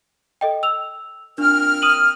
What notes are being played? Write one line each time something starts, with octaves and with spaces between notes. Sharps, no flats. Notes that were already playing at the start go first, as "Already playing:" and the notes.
A4 D#5 G5
E6 F7
A#2 C4 D4 F6
D#6 D#7 F#7